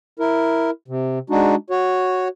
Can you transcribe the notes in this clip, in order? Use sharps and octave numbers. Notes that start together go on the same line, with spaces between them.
E4 A#4
C3
G#3 D4 D#4 F#4
F#4 C#5